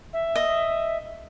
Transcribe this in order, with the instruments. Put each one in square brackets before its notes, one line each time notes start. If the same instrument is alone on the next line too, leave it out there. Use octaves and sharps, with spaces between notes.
[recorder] E5
[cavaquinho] D#5